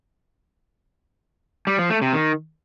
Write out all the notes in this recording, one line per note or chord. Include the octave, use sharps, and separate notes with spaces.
G3
F3
A3
C3
D#3